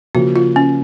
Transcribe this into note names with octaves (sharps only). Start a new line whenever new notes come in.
C#3 F3 A#3 F#4
F4
C#4